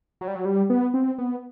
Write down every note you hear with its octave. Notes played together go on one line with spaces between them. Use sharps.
F#3
G3
F#3
G3
B3
C4
B3